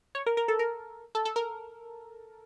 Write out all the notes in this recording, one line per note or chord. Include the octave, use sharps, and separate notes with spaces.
C#5
A#4
A#4
A4
A#4
A4
A4
A#4